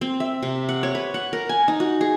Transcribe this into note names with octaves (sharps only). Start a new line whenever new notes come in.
C4
E5
C3
F#5
C#5
B4
F#5
A#4
G#5
D#4
F#4
G#4